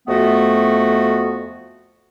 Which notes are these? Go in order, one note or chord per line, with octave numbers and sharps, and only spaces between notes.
F2 A3 B3 F#4